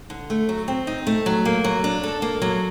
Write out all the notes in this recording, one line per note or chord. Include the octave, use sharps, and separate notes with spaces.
D3
A3
F#3
C4
D#4
A3
F#3
A#3
F#3
D4
A4
A#3
F#3